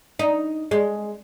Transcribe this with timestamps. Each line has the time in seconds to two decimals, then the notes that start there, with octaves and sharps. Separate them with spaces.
0.19 D#4
0.71 G#3